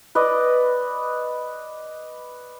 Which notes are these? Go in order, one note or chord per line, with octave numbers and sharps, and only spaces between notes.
B4 D5 D#5